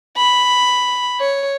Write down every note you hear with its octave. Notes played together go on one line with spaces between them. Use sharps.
B5
C#5